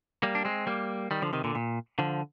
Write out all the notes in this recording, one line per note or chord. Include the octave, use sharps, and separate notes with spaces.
G3 A#3
D4
G#3 C4
G3 A#3
D#3 G3
D3 F3
C3 D#3
A#2 D3
A#2
D3 F3